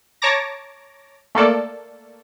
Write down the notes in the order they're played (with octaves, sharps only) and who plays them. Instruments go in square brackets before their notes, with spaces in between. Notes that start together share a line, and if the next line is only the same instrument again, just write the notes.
[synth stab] C#5 A5 A#5 D6 A#6
A3 A#3 A4 D5